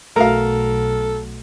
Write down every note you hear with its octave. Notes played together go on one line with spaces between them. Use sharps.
B1 A3 F#4 A4 A#4 F5